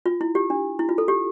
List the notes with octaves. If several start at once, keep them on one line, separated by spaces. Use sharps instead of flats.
F4
E4
G4
D4
E4
F4
A4
G4